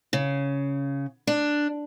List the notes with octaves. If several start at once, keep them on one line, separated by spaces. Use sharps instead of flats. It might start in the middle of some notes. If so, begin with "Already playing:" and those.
C#3
D4